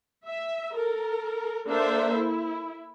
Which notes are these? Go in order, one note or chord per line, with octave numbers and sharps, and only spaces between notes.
E5
A4 A#4
A#3 D4 A4 C5 E5
E4